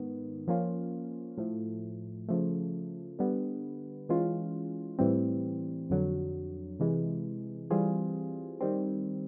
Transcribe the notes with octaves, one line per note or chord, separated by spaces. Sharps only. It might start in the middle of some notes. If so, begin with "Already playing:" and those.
Already playing: G#2 D#3 B3
F3 A#3 C#4 F4
A2 F3 A3
C#3 F3 A3
D3 G3 B3
E3 G#3 C#4 F4
A2 E3 G3 C4
F2 D3 F#3
C3 E3 G#3
E3 G3 C4 F4 G#4
D#3 G3 C4